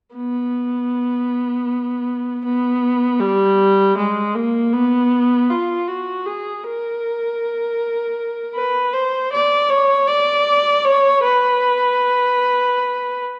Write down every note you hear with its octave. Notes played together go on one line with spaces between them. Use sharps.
B3
B3
G3
G#3
A#3
B3
F4
F#4
G#4
A#4
B4
C5
D5
C#5
D5
C#5
B4